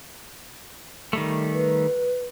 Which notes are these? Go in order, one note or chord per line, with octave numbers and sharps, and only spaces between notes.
D#3 G3 A3
B4